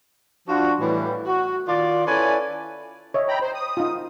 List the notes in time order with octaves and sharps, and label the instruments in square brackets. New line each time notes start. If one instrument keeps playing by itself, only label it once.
[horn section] F3 D4 F4 F#4
A2 E3 G3
F#4
D#3 F4 D5
C#4 E4 A4 B4 D5 G#5
[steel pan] C#5 D#5 E5
[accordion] G5 A#5 B5
C5
D#6
[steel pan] D#4 F4